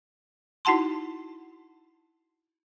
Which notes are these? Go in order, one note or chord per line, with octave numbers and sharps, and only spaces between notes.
D#4 E4 F#4 F#5 A5 C6